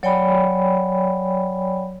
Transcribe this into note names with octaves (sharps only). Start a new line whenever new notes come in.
F#3 C#5 D5 G5 G#5 B5